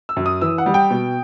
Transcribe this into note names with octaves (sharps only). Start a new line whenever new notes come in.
E6
F#2
D#6
E3 E6
F#5
G3
G5
B2